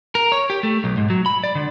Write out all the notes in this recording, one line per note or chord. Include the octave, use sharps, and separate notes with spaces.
A#4
C#5
G4
A3
B1
G#2
F#3
B5
D5
D3